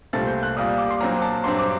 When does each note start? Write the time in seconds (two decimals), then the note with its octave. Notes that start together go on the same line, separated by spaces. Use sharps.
0.13 C2 A#2 A3 C4 A6
0.27 G6
0.43 F#6
0.57 A#2 G3 A#3 D#6
0.78 D6
0.91 C6
1.00 A#2 F#3 C4 A#5
1.22 A5
1.44 G2 F#3 C4 C6
1.59 D6